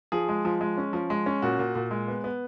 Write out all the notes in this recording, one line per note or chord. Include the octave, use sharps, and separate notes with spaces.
F3 G#4
G#3
F3
G#3
C#4
F3
G#3
C#4
A#2 F#4
A#2
A#2
G#3
B3
B3